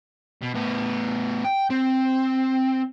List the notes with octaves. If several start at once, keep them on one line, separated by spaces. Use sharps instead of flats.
B2
A2 B3
G5
C4